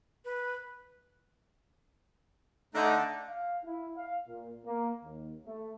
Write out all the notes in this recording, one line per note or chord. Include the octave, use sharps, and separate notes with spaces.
B4
D3 A3 D#4 A#5
F5
E4
F5
A#2
A#3
D#2
A3